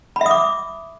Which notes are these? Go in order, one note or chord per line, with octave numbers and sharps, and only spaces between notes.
E5 B5 D6 D#6